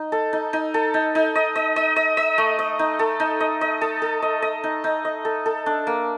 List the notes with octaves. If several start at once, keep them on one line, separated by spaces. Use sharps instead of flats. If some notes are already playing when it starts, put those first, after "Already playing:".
Already playing: D#4
A4
D#4
D#4
A4
D#4
D#4
D#5
D#5
D#5
D#5
D#5
A3
D#5
D#4
A4
D#4
D#5
D#5
A4
A4
D#5
D#5
D#4
D#4
D#5
A4
A4
D4
A#3